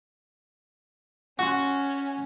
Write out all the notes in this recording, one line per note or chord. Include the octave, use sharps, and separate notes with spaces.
C#4 F#4 C6